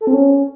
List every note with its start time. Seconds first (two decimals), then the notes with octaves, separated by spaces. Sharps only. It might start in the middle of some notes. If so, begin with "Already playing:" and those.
0.01 A4
0.07 C4
0.14 C#4